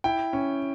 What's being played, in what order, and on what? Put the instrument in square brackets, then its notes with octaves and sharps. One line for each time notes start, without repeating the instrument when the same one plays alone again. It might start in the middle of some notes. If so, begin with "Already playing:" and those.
[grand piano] E4 G5
C#4